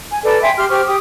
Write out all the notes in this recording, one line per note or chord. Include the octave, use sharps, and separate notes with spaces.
G#5
A4 B4 D5
E5 G5 G#5 C6
G4 C6 F6
G4 C5 C#6 F6
G4 D#6